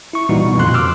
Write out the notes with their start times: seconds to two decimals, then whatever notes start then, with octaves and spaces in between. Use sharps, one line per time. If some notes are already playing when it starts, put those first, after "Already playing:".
0.13 E4 C#6
0.29 A#2 E3 G3 D#4 F#4
0.45 B2
0.58 F2 A#2 D3 C6 F#6
0.74 D6 E6 F6